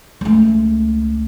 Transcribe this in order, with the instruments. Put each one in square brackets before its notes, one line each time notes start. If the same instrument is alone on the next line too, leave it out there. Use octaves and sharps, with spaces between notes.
[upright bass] C#2 A3